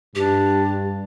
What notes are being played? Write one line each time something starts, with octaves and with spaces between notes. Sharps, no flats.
G2 D4 G4